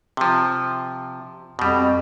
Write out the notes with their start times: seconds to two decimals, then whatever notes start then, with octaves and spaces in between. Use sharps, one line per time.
0.17 C3 F3
1.59 F2 B2 G3